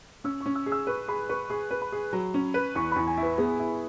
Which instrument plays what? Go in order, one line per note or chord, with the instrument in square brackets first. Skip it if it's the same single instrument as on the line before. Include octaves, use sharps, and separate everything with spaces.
[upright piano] C#4 [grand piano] E6
[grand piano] C#6
[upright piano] C#4
[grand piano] E6
[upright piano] G#4
[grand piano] E6
[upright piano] B4 [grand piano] C#6
[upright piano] G#4 [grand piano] B5
[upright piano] B4 [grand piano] C#6
[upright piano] G#4 [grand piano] C#6
[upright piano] B4
[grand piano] B5
[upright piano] G#4
F#3
C#4
B4
[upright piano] E2 [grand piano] C#6
[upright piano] E2 [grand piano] B5
[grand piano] G#5
[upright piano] E4
[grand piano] B4
[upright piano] B3 [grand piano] G#4
[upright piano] E4